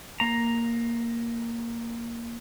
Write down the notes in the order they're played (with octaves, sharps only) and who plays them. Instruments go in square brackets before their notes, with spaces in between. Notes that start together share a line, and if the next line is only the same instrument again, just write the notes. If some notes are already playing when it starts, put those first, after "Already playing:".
[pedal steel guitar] A#3 A#5